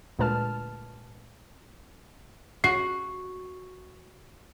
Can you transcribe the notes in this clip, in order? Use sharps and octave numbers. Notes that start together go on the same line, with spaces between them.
D2 A#2 G#3 B4 A5 F6
F#4 C7